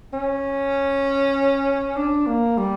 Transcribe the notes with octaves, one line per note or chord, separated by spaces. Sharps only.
C#4
D4
A#3
G3